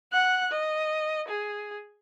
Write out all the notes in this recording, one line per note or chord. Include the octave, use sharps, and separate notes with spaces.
F#5 F#6
D#5
G#4